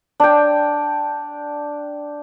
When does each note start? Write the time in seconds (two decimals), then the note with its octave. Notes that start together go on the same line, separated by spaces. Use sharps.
0.20 D4 G5